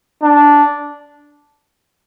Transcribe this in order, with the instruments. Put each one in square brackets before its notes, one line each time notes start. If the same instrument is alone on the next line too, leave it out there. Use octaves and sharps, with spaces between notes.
[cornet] D4